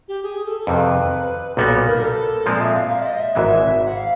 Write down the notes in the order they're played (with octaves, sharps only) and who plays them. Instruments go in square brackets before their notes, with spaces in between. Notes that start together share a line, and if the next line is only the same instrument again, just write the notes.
[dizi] G4
G#4
A4
[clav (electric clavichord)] F2 C3 D#3 [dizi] B4
[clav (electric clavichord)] B1 A#2 G3 B3 D#4 [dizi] B4
[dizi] B4
A#4
A4
[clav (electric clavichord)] A#2 F3 G#3 C4 [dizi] D5
[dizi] E5
F5
E5
D5
D#5
D#5
E5
[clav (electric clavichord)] G#1 G#2 E3 G#3 [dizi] E5
[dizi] F#5
F5